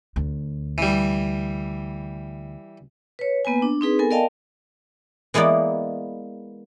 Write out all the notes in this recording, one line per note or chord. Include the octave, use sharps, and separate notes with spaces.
D2
E3 G3
B4 C#5
A#3 B3 B4 G#5
D4
C4 D#4 G#4 B4
B3 A4 A#4 G#5
A#4 D5 D#5 F5 G5 A5
E3 G#3 A#3 B3 D5